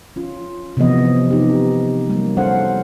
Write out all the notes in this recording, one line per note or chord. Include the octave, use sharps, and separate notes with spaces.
C#4 F4
C3 E3 F3 B3 D#5
C4 D#4 G4
F#3 G3 A#3
C#4 A4 C5 F5 F#5